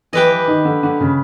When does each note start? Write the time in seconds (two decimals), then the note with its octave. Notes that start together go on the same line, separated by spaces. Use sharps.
0.13 E3 G4 B4 D#5
0.30 E3
0.47 D#3
0.65 D3
0.83 D3
1.01 C#3